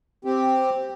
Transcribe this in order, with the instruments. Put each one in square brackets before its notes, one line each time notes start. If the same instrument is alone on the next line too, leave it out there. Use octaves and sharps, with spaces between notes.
[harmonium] C4 G4